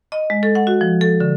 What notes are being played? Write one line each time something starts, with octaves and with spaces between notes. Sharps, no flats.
D#5
G#3
A4
F#5
F#4
F3
A4
D3